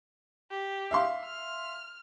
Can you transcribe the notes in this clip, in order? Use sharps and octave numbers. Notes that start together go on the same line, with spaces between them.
G4
E5 F5 C6
F6